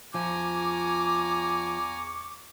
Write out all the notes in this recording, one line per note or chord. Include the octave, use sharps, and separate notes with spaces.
E2 F3 G#5 A#5 C#6 D6